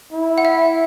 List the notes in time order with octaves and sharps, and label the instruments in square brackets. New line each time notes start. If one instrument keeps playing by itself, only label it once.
[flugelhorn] E4
[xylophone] F#5
E5